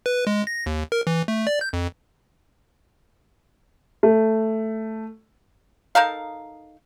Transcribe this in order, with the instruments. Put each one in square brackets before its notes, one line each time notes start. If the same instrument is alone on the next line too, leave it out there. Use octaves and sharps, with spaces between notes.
[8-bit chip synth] B4
G#3
A#6
D#2
A#4
E3
A3
D5
G6
F2
[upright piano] A3
[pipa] D#4 A4 A#4 F5